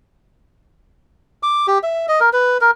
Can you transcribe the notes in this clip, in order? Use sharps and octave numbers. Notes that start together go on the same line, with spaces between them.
D6
G4
E5
D#5
A#4
B4
A#4